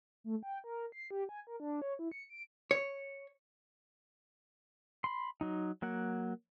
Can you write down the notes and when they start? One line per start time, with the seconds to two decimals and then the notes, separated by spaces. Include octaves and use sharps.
0.24 A3
0.43 G5
0.64 A#4
0.92 C7
1.11 G4
1.29 G#5
1.47 A#4
1.60 D4
1.82 C#5
1.99 E4
2.12 C#7
2.30 D7
2.71 C#5
5.04 B5 C6
5.41 F#3 D#4
5.82 F#3 A#3 F#5